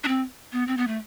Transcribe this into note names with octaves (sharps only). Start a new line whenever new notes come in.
D4
C4
B3
C4
B3
A3